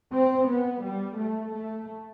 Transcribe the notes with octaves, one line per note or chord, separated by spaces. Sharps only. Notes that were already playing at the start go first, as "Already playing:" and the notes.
C4
B3
G3
A3
A3